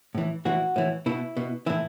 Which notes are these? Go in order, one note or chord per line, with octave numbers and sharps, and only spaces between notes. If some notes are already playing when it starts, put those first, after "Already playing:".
A2 E3
A2 E3 F#4
A2 E3
B2 E4
B2
A2 E3 E4